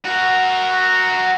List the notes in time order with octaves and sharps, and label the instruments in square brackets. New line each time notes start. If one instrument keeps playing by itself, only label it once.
[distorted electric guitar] F#4 A#4